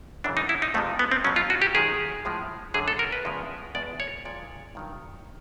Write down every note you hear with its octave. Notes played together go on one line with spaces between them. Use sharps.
F#2 C#3 E3 G#3 D4
D#4
E4
D#4
F2 C3 F3 G#3 A3
B3
C4
B2 F#3 C#4
F4
F#4
G4
F#2 D#3 G#3 G#4
A2 F3 G#3
F#2 D3 F#3 G#4
A4
A#4
B4
E2 C#3 F3 G#3
E2 B2 G#3 D5
C#5
A#2 F3 G#3 D5
G2 D#3 F#3